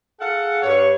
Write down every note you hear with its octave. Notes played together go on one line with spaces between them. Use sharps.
G#4 A4 F5 F#5
G2 C#5